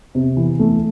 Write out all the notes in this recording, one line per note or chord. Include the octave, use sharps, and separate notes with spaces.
C3
E3
A3